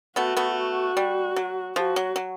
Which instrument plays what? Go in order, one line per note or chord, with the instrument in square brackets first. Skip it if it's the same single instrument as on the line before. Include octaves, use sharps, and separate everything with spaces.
[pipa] A3 B3 [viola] F#4
[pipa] A3 B3
[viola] F#4
[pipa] G3
F#3
[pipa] F3 [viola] F#4
[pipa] F#3
F#3